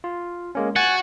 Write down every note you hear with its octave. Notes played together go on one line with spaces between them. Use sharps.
F4
G#3 A#3 C#4
F#4 G#5 F#6 A6